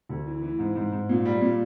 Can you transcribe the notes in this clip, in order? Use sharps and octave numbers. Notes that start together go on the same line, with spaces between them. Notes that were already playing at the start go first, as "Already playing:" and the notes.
D2
E3
E3
G#2
G#2
G#2
A#2
G3
A#2